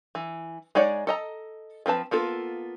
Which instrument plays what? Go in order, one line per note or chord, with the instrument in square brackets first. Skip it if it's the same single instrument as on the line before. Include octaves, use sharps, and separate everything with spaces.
[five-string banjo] E3
G#3 D#4 C#5 D5 F#5
A4 D#5 A#5
F3 C4 B4 A5
A#3 B3 F4 A4